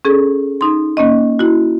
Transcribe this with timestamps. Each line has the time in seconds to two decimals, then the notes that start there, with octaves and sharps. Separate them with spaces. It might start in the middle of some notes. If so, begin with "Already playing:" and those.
0.05 C#4 G#4 A4
0.61 D#4 C6
0.97 A#3 C#4 D#5
1.39 E4 F#4